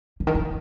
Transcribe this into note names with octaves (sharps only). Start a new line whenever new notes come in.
D3
D#3
E3